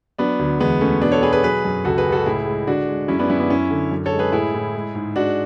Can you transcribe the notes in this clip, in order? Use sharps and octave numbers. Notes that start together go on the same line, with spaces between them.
F#3 B3 D4
D2
E2 G#3 B3
E2 A3 C#4
B2 B3 D4
A4 C#5
B2 G#4 B4
G#4 B4
F#3 G#4 B4
F#2
C#2 F#4 A4
G#4 B4
C#2
F#4 A4
A2 E4 G#4
G#3
D3 D4 F#4
G#3
F#2 C#4 E4
B3 D4
F#2 C#4 E4
B3 D4
F#2 C#4 E4
D3
F#2
A4 C#5
G#3
G#4 B4
A2 E4 G#4
A2
G#3
G#2
G#3 D4 F#4